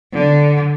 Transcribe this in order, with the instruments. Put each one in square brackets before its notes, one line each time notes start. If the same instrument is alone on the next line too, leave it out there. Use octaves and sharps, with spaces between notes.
[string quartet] D3